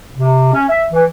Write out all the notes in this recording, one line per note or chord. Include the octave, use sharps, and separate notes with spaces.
C3
C#4
E5
E3